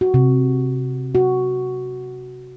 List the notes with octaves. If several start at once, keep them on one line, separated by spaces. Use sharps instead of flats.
F#4
C3
F#4